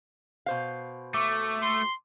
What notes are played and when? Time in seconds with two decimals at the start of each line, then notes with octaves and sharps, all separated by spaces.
0.46 B2 C5 F5
1.14 A3 C#6 D6
1.62 C6